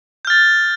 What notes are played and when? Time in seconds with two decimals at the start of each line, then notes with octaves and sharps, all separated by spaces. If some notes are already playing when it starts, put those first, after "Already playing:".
0.25 G6
0.27 F6
0.30 A6